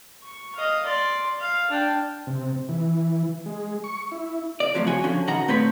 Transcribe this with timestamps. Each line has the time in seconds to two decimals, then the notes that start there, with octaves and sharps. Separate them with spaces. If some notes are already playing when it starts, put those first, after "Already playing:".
0.23 C#6
0.55 D#5 F5
0.85 D5 C6
1.40 F5
1.70 D4 G5
2.27 C3
2.69 E3
3.46 G#3
3.84 C#6
4.12 E4
4.60 D5
4.74 C#2 A2 C3 F3 F#3
4.87 F#4 C#5 G#5
5.04 D3 F3 C#4
5.27 B2 D#3 F#4 F#5 A#5
5.48 A#2 A3 C4 B4 C#5 B5